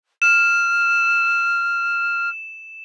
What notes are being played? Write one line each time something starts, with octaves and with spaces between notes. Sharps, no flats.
F6 E7